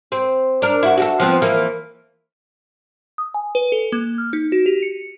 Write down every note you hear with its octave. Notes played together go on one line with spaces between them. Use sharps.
C4
D4 A#4
E4 F#4
F#4 G4 A4
F3 B3 C4
E3 A#3
D#6
G#5
B4
A4
A#3
F6
D#4
F#4
G4
C#7